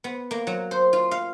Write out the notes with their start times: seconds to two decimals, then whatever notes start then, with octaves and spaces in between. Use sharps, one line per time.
0.04 B3
0.31 A#3
0.47 F#3
0.71 C5
0.93 F4
1.11 F5